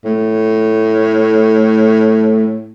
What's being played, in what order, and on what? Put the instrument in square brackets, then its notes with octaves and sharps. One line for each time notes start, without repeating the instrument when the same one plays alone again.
[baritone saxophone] A2 [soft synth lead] A3